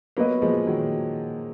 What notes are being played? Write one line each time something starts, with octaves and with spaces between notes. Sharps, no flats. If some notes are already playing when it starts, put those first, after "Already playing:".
F#3 A#3 B3 F#4 B4 D#5
F3 G#3
D#3 F#3